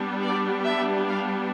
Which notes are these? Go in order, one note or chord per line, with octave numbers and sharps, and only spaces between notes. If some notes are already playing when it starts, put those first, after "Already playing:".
Already playing: G3 B3 D4
D5
E5
F5